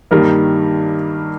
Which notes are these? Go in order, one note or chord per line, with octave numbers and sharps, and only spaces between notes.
G2 D#3 G3 A#3 A#4